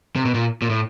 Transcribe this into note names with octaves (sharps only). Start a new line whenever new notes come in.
C3
B2
A#2
A#2
A2